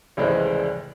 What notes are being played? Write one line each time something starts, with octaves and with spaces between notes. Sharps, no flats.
F1 C#2 A2 E3 G#3 C5